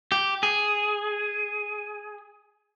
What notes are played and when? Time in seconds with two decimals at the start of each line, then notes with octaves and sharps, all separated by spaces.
0.12 G4
0.43 G#4